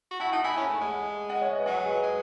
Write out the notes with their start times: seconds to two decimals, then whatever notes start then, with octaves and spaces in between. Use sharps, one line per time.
0.11 F#4
0.20 E4 F#5 A5
0.32 D#4 F#5 A5
0.44 E4 G#5 B5
0.56 C#4 G#5 B5
0.69 A3
0.81 G#3
1.29 D#5 F#5
1.42 C#5 E5
1.53 B4 D#5
1.66 F#3 D#5 F#5
1.85 G#4 B4
2.03 G#3